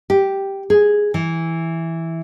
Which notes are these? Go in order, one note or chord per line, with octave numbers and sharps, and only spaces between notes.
G4
G#4
E3